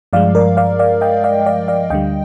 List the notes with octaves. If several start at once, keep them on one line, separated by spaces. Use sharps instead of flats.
G2 F3 G#3 D5 F5
A#4 D5
D5 F5
D5 F5
D#5 G5
D5 F5
D5 F5
D5 F5
D2 D3 G3 D#5 G5